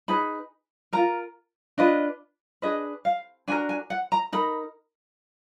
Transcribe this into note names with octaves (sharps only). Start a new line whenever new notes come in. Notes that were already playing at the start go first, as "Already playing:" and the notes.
D#4 G#4 B4 B5
F4 A#4 A#5
D4 F4 B4 D#5
D4 G#4 B4 D#5
F5
D4 F#4 A#4 G#5
G#5
F#5
A#5
D#4 A#4 B5